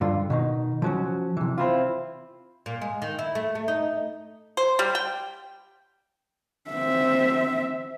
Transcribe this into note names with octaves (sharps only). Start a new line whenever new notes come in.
G2 D3 F4
B2 D#3 D#4
F3 F#3 C#4
C3 E3
C4 E4 F4
A#2
G#3
D#3
E4
A3
A3
D#4
C5
G3
G5
C4 E5